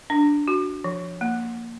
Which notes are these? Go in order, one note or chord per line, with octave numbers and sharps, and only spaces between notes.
D4
F#4
F3
A#3